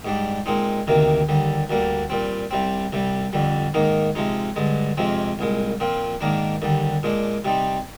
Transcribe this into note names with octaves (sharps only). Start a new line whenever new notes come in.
G#2 G3 D4
A#2 G#3 C4 D#4
D2 C3 D#3 A#3
D#2 D3 G3
D2 D3 G3 A#3
A#2 G3 C4
C2 C3 G3 C4
C2 C3 G3
F2 D3 G3
G#2 D#3 A#3 D#4
C3 F3 G#3 D#4
G2 D3 G#3
F2 C3 F3 G#3 C4
C2 A#2 G#3
A#2 F3 C4
G#2 D#3 A#3 D4
D#2 D3 G3
A#2 G#3 D4
C3 G3 C4 D#4